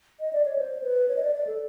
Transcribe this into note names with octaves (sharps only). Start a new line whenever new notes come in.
D#5
D5
C#5
C5
B4
C#5
D#5
D5
D5
A4